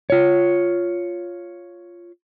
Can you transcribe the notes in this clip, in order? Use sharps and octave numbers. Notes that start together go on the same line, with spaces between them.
F4 C#5